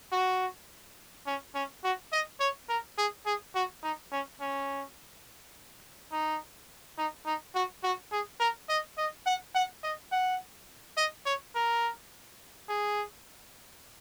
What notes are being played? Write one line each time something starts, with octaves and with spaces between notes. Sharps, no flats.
F#4
C#4
C#4
F#4
D#5
C#5
A#4
G#4
G#4
F#4
D#4
C#4
C#4
D#4
D#4
D#4
F#4
F#4
G#4
A#4
D#5
D#5
F#5
F#5
D#5
F#5
D#5
C#5
A#4
G#4